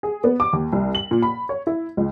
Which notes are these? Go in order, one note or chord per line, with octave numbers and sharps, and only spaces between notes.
G#4
B3
D6
D#2
C2
F#7
A#2
B5
C#5
E4
C#2